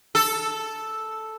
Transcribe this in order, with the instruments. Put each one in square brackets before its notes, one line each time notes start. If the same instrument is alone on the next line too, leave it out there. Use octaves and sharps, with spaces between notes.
[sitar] A4